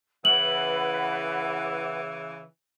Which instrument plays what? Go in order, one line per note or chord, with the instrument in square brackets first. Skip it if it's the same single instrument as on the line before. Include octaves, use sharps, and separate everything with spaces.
[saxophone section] C#3 E3 [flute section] B4 F#5 [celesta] F#7